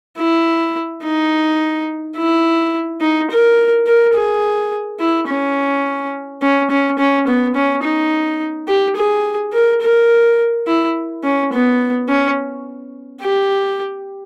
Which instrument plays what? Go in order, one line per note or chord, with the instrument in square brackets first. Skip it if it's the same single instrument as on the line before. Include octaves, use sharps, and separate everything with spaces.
[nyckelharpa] E4
D#4
E4
D#4
A#4
A#4
G#4
E4
C#4
C#4
C#4
C#4
B3
C#4
D#4
G4
G#4
A#4
A#4
E4
C#4
B3
C#4
G4